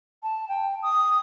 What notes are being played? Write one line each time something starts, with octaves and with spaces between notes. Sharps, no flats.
A5
G5
D#6